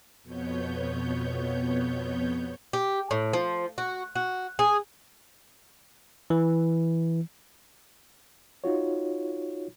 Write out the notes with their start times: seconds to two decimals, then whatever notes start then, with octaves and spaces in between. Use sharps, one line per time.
0.23 F2 B2 B3 C#5 G6
2.73 G4
3.11 A2
3.33 F3
3.78 F#4
4.15 F#4
4.59 G#4
6.30 E3
8.64 D#4 F4 F#4 C#5